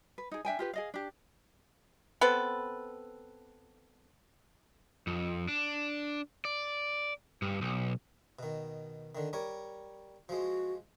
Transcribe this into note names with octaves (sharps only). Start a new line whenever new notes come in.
B4
D#4 G#4
D4 E5 G5 G#5
F4 G4 B4
G#4 D#5 F5
D4 G4
B3 C4 A4 B4
F2
D4
D5
G2
B1
B2 D#3
D3 D#3
G3 A#4 C#5
F3 G#3 F#4